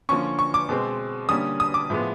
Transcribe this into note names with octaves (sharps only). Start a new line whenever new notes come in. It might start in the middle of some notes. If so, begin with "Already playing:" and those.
D3 F3 A#3 C#4 C#6
C#6
D6
B2 G#3 C4
D3 G3 A#3 C#4 D#6
D#6
D6
A2 F3 G#3 B3